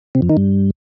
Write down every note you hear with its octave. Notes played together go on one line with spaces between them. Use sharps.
C3
F2
D#3
G2